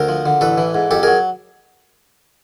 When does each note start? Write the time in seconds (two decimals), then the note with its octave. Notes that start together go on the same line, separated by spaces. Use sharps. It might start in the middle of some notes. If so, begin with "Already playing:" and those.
Already playing: D2 A#4 C5
0.08 F3
0.26 D3
0.41 A1 A4 B4
0.58 E3
0.75 G#2
0.91 F2 G4 A4
1.03 F#3 G#4 A#4